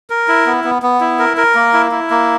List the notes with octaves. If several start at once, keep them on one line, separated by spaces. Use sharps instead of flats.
A#4
E4
B3
B3
B3
E4
A#4
A#4
A#3
E4
E4
A#3